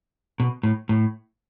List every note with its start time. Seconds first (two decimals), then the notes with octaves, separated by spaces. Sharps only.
0.40 B2
0.63 A2
0.89 A2